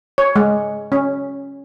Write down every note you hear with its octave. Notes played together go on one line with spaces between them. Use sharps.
C#5
G#3
C#4